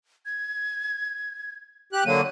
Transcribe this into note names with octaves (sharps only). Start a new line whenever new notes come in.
G#6
G4 F#6
D3 F#3 A#3 D#7